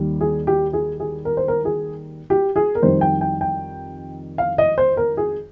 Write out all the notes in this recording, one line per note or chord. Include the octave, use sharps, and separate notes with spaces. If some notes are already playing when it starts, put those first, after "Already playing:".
Already playing: D#2 D#3 G3
G#4
G4
G#4
G#4
A#4
C5
A#4
G#4
G4
G#4
A#4
F2 D#3 G3 C5
G5
G5
G5
F5
D#5
C5
A#4
G#4